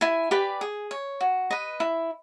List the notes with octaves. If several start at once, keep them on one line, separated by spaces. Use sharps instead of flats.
E4 G#5
G4 B4 D5
G#4
C#5
F#4
B4 D#5
E4